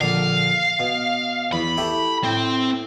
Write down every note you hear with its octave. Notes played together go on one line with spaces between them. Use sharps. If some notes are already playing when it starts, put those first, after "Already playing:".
A#1 D3 A#3 F5
B2
E2 B5
A3 E4 G4
A2 C4